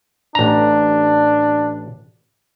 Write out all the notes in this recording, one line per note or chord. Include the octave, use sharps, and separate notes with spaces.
A1 D4 A#5